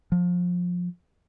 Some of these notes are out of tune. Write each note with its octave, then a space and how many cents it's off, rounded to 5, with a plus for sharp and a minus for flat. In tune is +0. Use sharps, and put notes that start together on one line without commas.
F3 +25